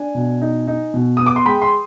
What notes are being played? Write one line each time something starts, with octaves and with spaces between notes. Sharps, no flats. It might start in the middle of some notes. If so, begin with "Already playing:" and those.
Already playing: D4 G#5
B2
D#4
D#4
B2
B3 D#6
D6
C6
G#3 G5 B5
C6